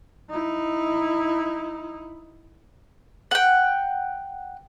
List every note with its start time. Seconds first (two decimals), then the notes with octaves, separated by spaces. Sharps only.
0.30 D#4 E4
3.31 F#5 G5